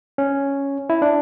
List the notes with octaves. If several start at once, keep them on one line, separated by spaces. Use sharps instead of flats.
C#4
E4
D4